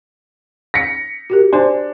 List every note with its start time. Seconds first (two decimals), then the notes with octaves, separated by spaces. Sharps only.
0.74 A#6 B6 C#7
1.30 F#4 G4 A#4
1.53 D4 C5 G#5 C6